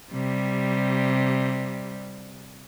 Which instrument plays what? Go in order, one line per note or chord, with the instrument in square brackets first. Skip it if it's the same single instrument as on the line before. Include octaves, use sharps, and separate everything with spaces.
[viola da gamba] C3 G3